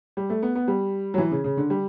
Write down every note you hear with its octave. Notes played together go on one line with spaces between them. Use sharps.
G3
A3
B3
B3
G3
F#3
E3
C#3
C#3
D3
G3